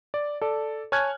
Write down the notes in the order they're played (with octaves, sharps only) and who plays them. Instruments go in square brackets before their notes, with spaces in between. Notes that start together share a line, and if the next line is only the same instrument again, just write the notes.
[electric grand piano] D5
A4 D5
C#5 G#5 A5 F6 F#6 G#6